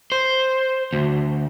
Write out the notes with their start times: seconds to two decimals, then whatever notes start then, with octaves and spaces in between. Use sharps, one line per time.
0.12 C5
0.93 D2